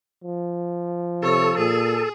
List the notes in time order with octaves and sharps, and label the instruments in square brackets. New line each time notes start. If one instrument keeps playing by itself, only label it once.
[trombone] F3
[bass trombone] C3 [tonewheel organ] A4 [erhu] C#5
[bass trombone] A#2 [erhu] G#4